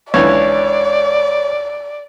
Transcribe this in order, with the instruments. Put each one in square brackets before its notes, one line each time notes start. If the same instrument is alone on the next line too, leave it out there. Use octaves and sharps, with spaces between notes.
[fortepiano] C#2 D3 E3 [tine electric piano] C#5 [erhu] D5